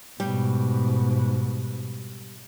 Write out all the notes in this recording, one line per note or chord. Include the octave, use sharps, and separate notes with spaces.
G#2 B2 G3